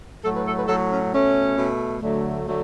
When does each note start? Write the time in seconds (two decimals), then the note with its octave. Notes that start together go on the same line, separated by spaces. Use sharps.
0.24 A2 F#3 A3 A4
0.35 B4
0.46 A4
0.57 B4
0.68 A2 F#3 A3 A4
0.91 C#4
1.13 B2 A3 C#4
1.57 B2 A3
2.01 D2 D3 F#3 A3
2.46 D3 F#3 A3